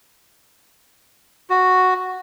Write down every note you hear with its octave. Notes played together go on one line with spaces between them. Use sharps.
F#4